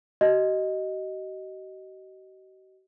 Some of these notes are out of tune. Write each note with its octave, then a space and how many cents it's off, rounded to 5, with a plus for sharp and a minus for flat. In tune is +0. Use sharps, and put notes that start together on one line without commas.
F#4 +45 D#5 +0